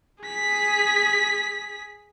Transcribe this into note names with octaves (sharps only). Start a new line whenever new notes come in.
G#4 B6